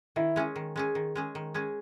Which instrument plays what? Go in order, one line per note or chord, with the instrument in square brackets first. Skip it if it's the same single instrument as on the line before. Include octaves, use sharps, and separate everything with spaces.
[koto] D#3 [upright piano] E4
[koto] G#3 C#4 G#4
D#3
G#3 C#4 G#4
D#3
G#3 C#4 G#4
D#3
G#3 C#4 G#4